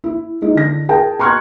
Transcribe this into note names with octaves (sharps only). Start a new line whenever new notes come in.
E4
G#3 D#4 E4
D3 A#6
G#4 A#4 G5 A5
A#5 C6 C#6 F6 F#6 G#6